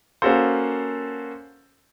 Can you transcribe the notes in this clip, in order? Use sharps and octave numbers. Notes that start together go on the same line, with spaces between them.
A#3 C#4 F#4 A4 C5